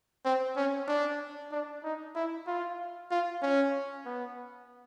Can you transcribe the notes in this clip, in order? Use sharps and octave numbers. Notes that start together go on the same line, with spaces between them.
C4
C#4
D4
D4
D#4
E4
F4
F4
C#4
B3